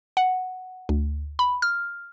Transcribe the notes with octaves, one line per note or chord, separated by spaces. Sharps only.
F#5
D2
B5
F6